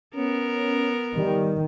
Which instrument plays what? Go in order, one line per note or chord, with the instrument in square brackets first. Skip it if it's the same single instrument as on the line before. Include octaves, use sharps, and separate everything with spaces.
[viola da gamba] B3 A#4 [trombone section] C#4
[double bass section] D#3 [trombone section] G3